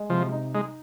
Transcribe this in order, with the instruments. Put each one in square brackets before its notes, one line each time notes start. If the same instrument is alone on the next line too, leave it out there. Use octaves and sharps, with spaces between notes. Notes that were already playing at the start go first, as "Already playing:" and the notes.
Already playing: [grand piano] G#3
[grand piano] C3 [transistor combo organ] F3
[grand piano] D#4
[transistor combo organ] G#3 [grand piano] D#4